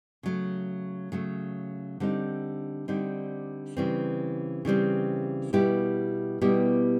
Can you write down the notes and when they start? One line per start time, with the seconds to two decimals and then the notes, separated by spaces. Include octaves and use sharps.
0.23 C#3 F#3 A3
1.12 C#3 F#3 A3
2.00 D3 G3 C4 D#4
2.88 D3 G3 C4 D#4
3.77 C#3 E3 G3 C4
4.65 C#3 E3 G3 C4
5.53 B2 G3 B3 E4 G4
6.41 B2 G3 B3 E4 G4